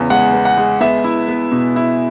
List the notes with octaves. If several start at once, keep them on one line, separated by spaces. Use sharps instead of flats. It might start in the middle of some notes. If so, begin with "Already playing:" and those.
Already playing: E2 C#3 B3
G#3 F#5
B3
F#5
G#3
B3 E5
E4
B3
B2
E4